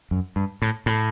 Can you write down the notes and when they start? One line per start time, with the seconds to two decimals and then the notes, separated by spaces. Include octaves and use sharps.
0.11 F#2
0.36 G2
0.62 A2
0.86 A2